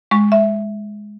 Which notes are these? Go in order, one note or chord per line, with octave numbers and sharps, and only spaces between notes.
G#3 C#6
E5